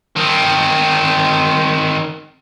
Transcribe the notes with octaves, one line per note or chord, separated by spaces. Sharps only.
D#3 C4